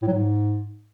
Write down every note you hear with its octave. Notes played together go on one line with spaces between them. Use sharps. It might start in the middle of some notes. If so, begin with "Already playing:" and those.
A2
F#3
G#2